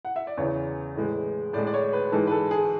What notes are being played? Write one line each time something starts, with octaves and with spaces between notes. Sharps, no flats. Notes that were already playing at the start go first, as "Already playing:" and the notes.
F#5
E5
D5
E2 C#3 E3 C#5
A2 E3 G#3
A2 G#3 D5
D5
C#5
B4
G#2 E3 G#3 A4
B4
A4
G#4